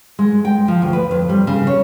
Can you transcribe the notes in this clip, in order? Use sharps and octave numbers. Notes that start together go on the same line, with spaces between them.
G#3
G5
F3
D2
B4
F2
G3
C#3
C#5